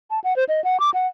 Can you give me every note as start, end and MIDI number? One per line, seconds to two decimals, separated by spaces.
0.11 0.19 81
0.24 0.36 78
0.36 0.44 72
0.49 0.63 75
0.64 0.80 78
0.80 0.90 86
0.94 1.07 78